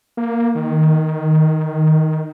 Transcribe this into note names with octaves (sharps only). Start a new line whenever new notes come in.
A#3
D#3